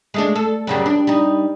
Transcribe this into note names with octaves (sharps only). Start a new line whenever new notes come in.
G#3 A3 D4
A4
F#2 C#3 G3
D4
G3 D#4